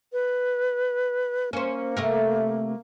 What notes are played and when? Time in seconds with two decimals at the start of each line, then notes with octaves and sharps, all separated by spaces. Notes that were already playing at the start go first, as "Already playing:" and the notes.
0.13 B4
1.53 A#3 C#4 C5
1.97 C3 A3 A#4